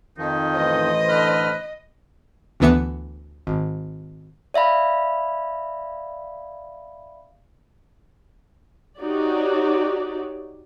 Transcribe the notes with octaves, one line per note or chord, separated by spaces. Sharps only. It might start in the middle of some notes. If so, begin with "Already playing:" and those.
F2 D#3 F3 D#4
A1 E3 C5 D#5
D3 B4 F6
D2 D3 E3 B3 E5 C#7
G#1
D5 E5 F5 B5
D#4 F#4 G4 C#5 D5